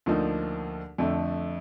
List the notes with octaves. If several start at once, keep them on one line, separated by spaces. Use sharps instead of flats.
D2 D3 F3 A#3 D#4
F2 D3 A3